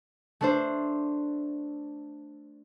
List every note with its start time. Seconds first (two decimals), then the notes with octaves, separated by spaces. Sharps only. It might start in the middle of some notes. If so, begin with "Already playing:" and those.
0.41 A3 D4 C5